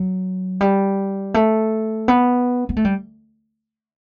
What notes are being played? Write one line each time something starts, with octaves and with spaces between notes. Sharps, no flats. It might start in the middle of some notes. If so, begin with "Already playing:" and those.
Already playing: F#3
G3
A3
B3
B3
A3
G3